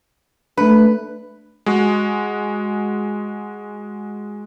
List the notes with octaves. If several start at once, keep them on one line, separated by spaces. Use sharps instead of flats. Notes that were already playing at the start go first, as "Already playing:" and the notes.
A3 D4 B4
G#3 F#4